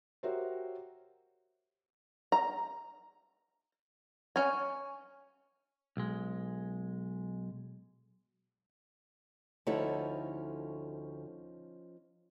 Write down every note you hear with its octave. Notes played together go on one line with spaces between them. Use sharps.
F#4 G4 A#4 C5 C#5 E5
A#5
C#4 G#5
B1 G#3
D2 F3 C#4 D#4 E4 A4